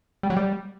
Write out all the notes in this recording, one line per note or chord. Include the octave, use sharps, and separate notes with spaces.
G3
F#3
G3